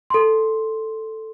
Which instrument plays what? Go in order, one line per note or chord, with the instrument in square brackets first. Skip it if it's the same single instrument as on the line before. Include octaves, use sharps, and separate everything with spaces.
[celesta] A4 C6